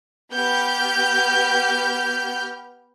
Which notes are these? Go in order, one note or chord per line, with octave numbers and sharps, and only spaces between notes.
B3 G4 F6 G6